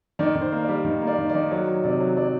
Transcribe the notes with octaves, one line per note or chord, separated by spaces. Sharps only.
D#3 D5
D#3
C5
A#3
D5
G3
D#3
A#3
D5
D#3
D5
D#3
F#3 D5
F#3
C3 D5
F#3
F#3 D5